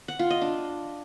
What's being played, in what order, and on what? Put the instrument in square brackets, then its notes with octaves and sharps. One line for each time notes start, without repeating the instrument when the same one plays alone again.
[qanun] F#5
F4
D#5
D4